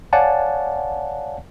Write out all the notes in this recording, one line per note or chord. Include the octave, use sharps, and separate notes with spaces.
C#5 D5 F5 F#5 G#5 A5